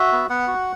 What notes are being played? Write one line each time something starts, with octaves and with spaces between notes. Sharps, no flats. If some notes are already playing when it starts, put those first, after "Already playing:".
Already playing: F#4 E5
B3
B3 F#5
F#4